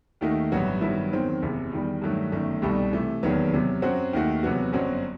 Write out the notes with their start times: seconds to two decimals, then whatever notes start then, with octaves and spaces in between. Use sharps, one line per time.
0.21 D#2 D#3 A3 D#4 F#4
0.52 A1 G2 F#3 B3 F#4
0.81 G2 D#3 F#3 B3 E4
1.12 E2 D#3 F#3 C4
1.42 F#1 E2 C3
1.72 E2 D#3 G3
2.02 G2 D#3 F#3 A3
2.32 G1 F#2 D#3 A3
2.62 C2 B2 G3 D#4 A4
2.93 C3 E3 A3
3.23 E1 D#2 D#3 F#3 B3
3.53 E2 C3 F#3
3.82 F#2 F#3 C4 F#4
4.13 D#2 D#3 A3 D#4 F#4
4.43 E2 C3 F#3 B3 F#4
4.73 G1 F#2 F#3 C4 F#4